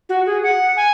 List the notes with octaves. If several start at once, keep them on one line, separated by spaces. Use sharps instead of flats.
F#4
G#4
F#5
G#5